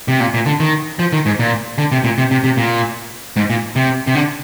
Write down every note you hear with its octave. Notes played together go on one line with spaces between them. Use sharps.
C3
A#2
A#2
D3
D#3
F3
D#3
G#2
A#2
D3
C3
A#2
C3
C3
C3
A#2
G#2
A#2
C3
C3
D3